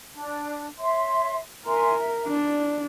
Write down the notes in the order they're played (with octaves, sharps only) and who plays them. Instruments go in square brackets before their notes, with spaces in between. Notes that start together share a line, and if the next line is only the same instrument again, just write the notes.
[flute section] D4
C#5 E5 C6
[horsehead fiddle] A#4 [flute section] E5 G#5 C6
[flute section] E5
[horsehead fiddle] D4 [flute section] D5